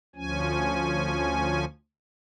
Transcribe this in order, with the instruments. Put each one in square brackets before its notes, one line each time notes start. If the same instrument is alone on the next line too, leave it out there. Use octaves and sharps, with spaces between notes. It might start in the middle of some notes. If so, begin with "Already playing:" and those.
[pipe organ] D2 F3 C#4 G#5